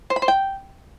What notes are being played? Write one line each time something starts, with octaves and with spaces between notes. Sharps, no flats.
C5
B5
C5
G5